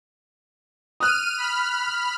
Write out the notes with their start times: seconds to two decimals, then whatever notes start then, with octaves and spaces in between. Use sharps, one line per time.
1.00 D#6 F6 F#6 D#7
1.38 B5 F6